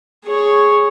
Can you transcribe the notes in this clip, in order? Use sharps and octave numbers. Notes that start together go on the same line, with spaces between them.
G#4 C#5